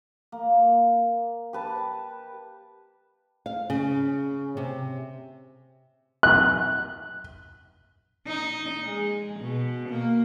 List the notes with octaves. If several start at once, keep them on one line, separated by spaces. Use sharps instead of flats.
A#3
G4 B4 A5
F5
C#3
C3
F#6
D#4
G#3
B2
A#3